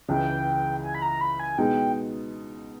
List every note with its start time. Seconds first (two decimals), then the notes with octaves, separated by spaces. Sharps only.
0.08 C#2 C#3 E3 G5
0.83 G#5
0.95 B5
1.02 A#5
1.21 B5
1.40 G#5
1.58 B2 G#3 D#4 G5